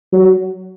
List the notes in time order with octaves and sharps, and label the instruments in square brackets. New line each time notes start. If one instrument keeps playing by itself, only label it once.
[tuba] F#3